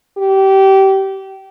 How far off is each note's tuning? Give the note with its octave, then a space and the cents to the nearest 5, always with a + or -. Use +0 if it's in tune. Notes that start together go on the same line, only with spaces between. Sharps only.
G4 -25